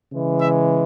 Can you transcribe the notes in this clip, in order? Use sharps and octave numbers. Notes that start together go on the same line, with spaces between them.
C#3 E3 G#3
E5